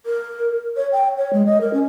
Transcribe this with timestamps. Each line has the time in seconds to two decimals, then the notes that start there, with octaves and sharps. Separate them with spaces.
0.06 A#4
0.76 C#5
0.92 G5
1.18 C#5
1.33 G#3
1.46 D#5
1.61 A#4
1.73 C#4